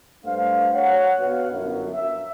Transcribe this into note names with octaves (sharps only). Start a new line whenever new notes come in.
G2 A3 D4 C5 F5
C#5 F#5
B2 F5
G1 F#2
E5